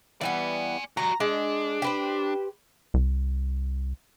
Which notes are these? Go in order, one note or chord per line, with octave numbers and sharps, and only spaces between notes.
E3 G3 B3 D5 G#5
G3 F#4 A#5
G#3 D4
G4 B4 C5
C2